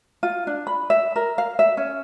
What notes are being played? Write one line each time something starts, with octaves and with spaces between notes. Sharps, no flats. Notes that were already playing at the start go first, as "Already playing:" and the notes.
F4
D4
B5
E5
A#4
F5
E5
C#4